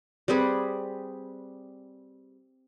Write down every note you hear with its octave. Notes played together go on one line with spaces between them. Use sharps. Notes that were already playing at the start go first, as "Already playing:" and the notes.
G3 C4 G#4 B4